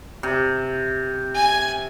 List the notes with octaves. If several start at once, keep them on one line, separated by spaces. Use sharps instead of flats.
C3
G#5